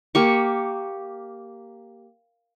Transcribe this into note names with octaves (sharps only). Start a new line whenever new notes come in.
A#3 G4 C#6